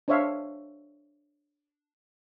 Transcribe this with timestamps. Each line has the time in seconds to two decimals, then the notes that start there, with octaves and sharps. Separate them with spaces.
0.08 D4 C5 C#5 E5 F5